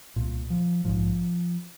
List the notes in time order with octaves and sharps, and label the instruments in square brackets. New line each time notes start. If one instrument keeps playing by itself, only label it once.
[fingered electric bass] C2 A#2
F3
A#1 G#2 F3